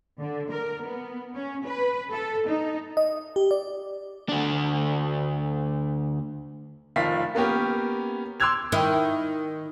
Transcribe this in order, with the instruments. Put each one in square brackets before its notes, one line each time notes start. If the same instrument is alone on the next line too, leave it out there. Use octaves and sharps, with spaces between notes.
[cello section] D3
A#4
B3
C#4
B4
A4
D#4
[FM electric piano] D#5
G4
D5
[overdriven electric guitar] D2 D4
[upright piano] F1 D#3 F3 F5 B6
A#3 B3 C#4 G4 A#4
C6 D6 E6 F#6 G#6 F7
[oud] D#3 E4